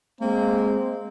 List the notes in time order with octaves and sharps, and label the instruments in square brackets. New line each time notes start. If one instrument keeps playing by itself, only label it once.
[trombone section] G#3 C4 [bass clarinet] A#3